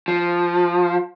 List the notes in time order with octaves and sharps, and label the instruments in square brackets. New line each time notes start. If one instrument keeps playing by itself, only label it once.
[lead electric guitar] F3